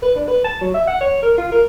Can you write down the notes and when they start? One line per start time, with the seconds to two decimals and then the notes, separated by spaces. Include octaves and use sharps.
0.02 B4
0.16 D4
0.28 B4
0.45 A5
0.61 F#3
0.74 E5
0.87 F#5
1.01 C#5
1.22 A#4
1.38 F4
1.52 A#4